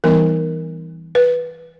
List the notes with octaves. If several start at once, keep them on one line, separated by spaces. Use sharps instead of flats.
E3 G3 B3 D#4 A#4
B4